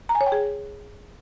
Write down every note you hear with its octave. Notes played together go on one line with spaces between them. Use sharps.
A#5
G#5
C#5
G5
G#4